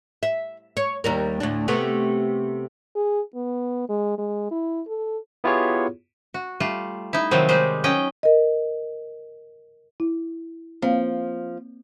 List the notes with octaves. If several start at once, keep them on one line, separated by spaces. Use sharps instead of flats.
E5
C#5
D#2 G3 A#4
D2 A2 D4
C3 A3 B3
G#4
B3
G#3
G#3
E4
A4
B3 E4 F4 G4 G#4 C#5
F#4
G3 A3 F4
D#4 E4
C3 D#3 F3 F#3 C4
G3 G#3 D#4 G4 C5
F#3 C#4 D#5 G5
A#4 D#5
E4
F3 A#3 C4 F5